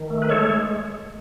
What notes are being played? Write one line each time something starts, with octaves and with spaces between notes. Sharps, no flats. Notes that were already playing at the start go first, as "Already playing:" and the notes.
Already playing: D#3
A3
B4
G#3 A4 C#5
G#3